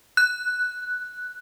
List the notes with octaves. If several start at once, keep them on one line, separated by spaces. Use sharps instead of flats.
F#6